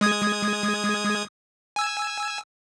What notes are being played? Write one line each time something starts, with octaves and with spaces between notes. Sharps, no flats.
G#3 D#6 G#6
G#5 E6